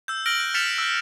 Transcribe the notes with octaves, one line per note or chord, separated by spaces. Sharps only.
E6 G6
E6 F6 A#6 D7 F#7
F#6
F6 A6 B6 C#7 E7 F7
E6 F#6